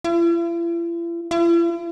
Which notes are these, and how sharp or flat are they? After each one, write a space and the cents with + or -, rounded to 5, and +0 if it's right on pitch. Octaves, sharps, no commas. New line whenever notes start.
E4 +45
E4 +45